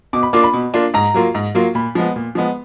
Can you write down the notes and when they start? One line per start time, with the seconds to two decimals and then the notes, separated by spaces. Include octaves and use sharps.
0.13 B2 D6
0.23 B5
0.33 A#3 D4 F4 D6
0.44 B5
0.53 B2
0.74 A#3 D4 F4
0.94 G#2 A#5
1.14 F#3 A#3 F4
1.35 G#2
1.55 F#3 A#3 F4
1.75 A#2 B5
1.95 F3 G#3 B3
2.16 A#2
2.35 F3 G#3 B3